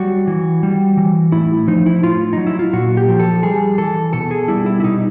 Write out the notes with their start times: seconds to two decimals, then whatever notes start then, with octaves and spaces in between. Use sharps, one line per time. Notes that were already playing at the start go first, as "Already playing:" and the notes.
Already playing: F#3 G3 F#4
0.27 E3
0.63 G3
0.97 E3
1.32 A2 E4
1.68 F3 D#4
1.86 E4
2.03 A2 F4
2.33 F#3 D#4
2.47 E4
2.59 F4
2.73 A#2 F#4
2.97 G4
3.08 F3
3.20 A4
3.43 G3 G#4
3.78 E3 A4
4.13 B2 A4
4.31 G#4
4.48 G3 E4
4.66 E4
4.80 E4
4.84 B2 D#4